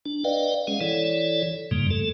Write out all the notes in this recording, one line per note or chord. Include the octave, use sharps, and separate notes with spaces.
D4
B4 D5 D#5 F5 G5
G#3 C#4 G#4 F5 F#5
E3 E4 A4 C#5 D5
F2 G#2 C#3 G3 A#3
A3 A4